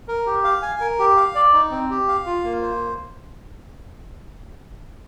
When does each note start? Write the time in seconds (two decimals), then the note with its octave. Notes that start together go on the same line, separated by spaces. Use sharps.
0.08 A#4
0.26 G4
0.44 F5
0.62 G#5
0.81 A#4
0.99 G4
1.17 F5
1.35 D5
1.53 D#4
1.71 C4
1.90 G4
2.08 F5
2.26 F4
2.44 A#3
2.62 C5